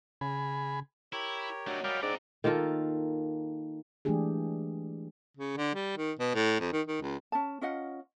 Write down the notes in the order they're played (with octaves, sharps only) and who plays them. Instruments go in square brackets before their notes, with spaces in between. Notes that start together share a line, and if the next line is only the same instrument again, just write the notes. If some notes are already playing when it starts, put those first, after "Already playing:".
[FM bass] C#3 [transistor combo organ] G#4 B5
[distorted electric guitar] E4 [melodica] G4 A#4 C#5
[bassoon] F#3 [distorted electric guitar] A3 D#4 [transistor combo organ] D4
[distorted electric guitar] G3 G#3 [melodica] A#4 D5 D#5 [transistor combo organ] F5 G5 D6
[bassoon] G#2 [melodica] C4 [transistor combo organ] D4 D5 [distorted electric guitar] E4 A#5
[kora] D#3 A#3 F4 A4
[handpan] E3 G#3 A3 D4 G4 G#4
[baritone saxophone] C#3
D3
G3
D#3
B2
A2
F2
D#3
D#3
C#2
[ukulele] C#4 A5
C#4 F4 D#5 F#5